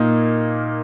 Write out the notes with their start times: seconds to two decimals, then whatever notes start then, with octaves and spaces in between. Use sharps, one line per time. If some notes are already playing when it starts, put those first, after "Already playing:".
Already playing: A#2 A#3 D#4